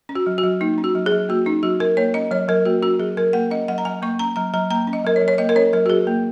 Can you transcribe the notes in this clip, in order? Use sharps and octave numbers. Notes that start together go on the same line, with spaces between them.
C#4
F#4
F#3
F#4
F#3
A#3 D#4
C#4
F#4
F#3
G#4
F#3
A#3 F#4
C#4 D#4
F#3 F#4
F#3 A#4
A#3 C#5
C#4 D#5
F#3 C#5
F#3 A#4
A#3 F#4
C#4 F#4
F#3 G#4
F#3 A#4
A#3 F#5
C#4 D#5
F#3 F#5
A#5
F#3 G#5
A#3 C#6
C#4 A#5
F#3 A#5
F#3 A#5
A#3 A#5
C#4
D#5
F#3 A#4
C#5
F#3
C#5
A#3 D#5
A#4
C#4 C#5
F#3 A#4
F#4
F#3 G#4
A#3